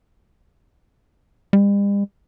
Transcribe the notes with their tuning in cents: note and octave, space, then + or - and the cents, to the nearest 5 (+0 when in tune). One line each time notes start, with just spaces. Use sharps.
G3 +45